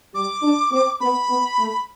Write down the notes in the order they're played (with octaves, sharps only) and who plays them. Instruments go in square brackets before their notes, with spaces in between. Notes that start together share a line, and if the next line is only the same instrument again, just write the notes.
[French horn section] G3 [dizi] D6
[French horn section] D4
C4
[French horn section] B3 [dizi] B5
[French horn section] B3
A3